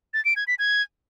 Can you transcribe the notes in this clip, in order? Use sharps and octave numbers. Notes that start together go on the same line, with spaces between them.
A6
D7
G#6
B6
G#6